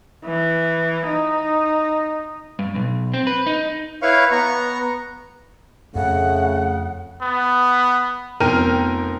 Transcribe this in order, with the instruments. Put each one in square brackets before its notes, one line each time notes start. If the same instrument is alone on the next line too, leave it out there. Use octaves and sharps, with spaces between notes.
[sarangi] E3
D#4
[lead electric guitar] G2
B1
C4
B4
D#4
[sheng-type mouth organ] E4 B4 C#5 F5 C#6
B3 A#5 C#6
[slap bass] F2 [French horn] C#3 [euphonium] A3 [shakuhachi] F#5
[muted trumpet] B3
[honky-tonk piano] F1 B3 A#4 G5 F6 D#7